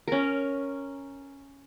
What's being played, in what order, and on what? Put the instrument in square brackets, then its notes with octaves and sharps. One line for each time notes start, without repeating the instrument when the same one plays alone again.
[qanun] C#4 A#4